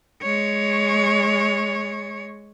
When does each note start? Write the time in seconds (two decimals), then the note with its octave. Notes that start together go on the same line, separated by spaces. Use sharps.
0.22 G#3 C#5